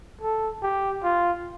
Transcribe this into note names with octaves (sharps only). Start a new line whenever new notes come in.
A4
G4
F4